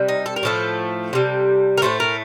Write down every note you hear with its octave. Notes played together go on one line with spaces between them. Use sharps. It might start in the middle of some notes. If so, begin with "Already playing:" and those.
Already playing: C3 G3
D#4
A4
A#4
A2 F3 A3 A4
C3 G3
A#4
A2 F3 A3 C5
A#4